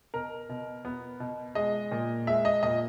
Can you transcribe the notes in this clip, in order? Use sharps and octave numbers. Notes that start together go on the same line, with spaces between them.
B2 A#4
B2
B3
B2
G#3 D#5
A#2
G#3 E5
D#5
A#2 D#5